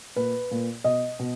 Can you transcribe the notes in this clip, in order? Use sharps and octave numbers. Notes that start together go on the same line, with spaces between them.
A#2 B4
A#2
B2 D#5
B2